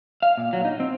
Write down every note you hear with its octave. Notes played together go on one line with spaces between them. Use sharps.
F5
A#2
F#3
D#4
C4